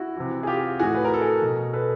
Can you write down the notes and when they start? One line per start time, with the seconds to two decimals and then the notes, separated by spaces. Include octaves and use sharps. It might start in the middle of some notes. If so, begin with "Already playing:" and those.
Already playing: E4 F#4
0.16 C3 E3
0.43 G#4
0.47 F4 G4
0.79 A2 E3 F#4 G#4
0.95 B4
1.05 A#4
1.14 A4
1.22 G#4 A#4
1.42 B2
1.73 A4 B4